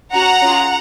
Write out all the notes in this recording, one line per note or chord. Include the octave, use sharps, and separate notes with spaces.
C#4 F#4 F#5 A#5
C#4 F4 G#4